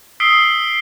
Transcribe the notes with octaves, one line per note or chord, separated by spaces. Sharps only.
D#6 E6 B6 C7 D7 G7